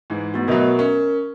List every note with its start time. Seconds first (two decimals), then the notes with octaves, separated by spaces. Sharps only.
0.10 G#2 E3
0.34 A3 B3 F#4
0.48 B2 F#3 A#4 D#5 E5
0.79 C#4 A#4